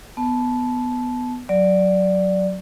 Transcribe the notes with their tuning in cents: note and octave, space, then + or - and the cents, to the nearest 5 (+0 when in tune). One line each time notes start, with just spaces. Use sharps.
B3 +5 A5 -15
F#3 +0 D5 +0